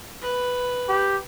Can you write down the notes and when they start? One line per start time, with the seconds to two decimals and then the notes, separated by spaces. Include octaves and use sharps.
0.22 B4
0.89 G4